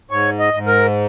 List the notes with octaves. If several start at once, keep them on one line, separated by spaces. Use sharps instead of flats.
G#2 C#5
D#5
G#2
A#4